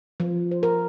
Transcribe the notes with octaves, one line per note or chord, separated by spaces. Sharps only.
F3
C5
A#4